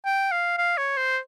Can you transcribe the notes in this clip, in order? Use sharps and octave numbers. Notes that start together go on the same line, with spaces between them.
G5
F5
F5
C#5
C5